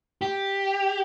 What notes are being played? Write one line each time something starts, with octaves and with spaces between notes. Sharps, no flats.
G4